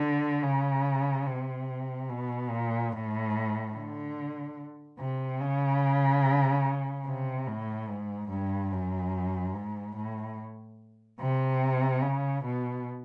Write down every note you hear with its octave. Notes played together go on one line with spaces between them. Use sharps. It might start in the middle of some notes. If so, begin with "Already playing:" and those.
Already playing: D3
C#3
C3
B2
A#2
A2
D3
C3
C#3
C3
A2
G#2
G2
F#2
G#2
A2
C3
C#3
B2